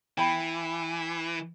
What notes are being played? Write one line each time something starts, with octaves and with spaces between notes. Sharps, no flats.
E3 G5 B5